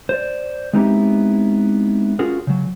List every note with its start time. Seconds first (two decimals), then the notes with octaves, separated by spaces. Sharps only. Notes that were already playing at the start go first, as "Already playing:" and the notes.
0.09 C5 D5
0.73 G#3 B3 C4 D#4 E4 G4
2.19 C#4 F4 F#4 G#4 A#4
2.47 C#3 F#3